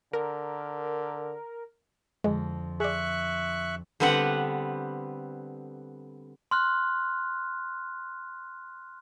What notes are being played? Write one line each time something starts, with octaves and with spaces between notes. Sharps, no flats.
D3 A#4
F2 D3 G#3 G#4 A#6
G#4 D5 E5 C#6 F#6
D3 G3 B3 C4 B4 F#5
C6 F6 F#6